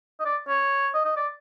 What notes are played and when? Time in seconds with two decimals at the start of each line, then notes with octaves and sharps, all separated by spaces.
0.20 D#5
0.26 D5
0.48 C#5
0.94 D#5
1.05 D#5
1.17 D5